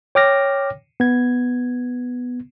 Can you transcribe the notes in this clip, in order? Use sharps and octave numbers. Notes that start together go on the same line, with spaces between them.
C#5 G5 D6 F6 A#6
B3 G#6